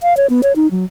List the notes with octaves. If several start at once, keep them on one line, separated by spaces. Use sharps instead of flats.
F5
C#5
B3
C#5
D#4
F#3